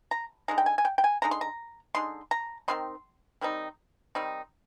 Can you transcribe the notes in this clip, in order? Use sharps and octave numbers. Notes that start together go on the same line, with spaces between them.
A#5
D3 G#3 D#4 A#5
G5
G#5
G#5
G5
G5
G#5
D3 G#3 D#4 A#5
C6
A#5
D3 G#3 D#4 C6
A#5
D#3 G3 C4 D#4 C6
D#3 G3 C4 D#4
D#3 G3 C4 D#4